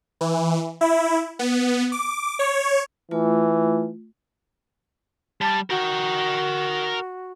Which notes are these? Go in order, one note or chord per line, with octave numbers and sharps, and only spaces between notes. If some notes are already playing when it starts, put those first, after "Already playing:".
E3
E4
B3
D6
C#5
E3 A3 F4
G3 A5
F#4 A#4 G5